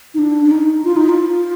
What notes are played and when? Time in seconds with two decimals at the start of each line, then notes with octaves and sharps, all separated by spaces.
0.14 D#4
0.19 D4
0.45 D4
0.51 D#4
0.84 F4
0.96 D#4
1.09 F4